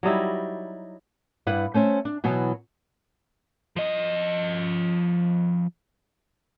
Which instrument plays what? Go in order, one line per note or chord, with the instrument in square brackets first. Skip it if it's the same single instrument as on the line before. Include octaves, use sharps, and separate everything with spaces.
[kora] F#3 G3 D#4 E4
[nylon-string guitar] G2 E4 B4 F#5
A3 C#4 C5 E5
D4
B2 E3 F#3 B3
[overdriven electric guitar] F3 D#5